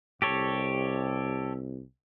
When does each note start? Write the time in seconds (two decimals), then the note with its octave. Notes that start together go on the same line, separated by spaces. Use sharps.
0.22 C2 G4 A4 C#5